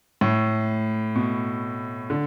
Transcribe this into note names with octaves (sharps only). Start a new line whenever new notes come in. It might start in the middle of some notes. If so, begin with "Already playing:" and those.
A2
B2
D3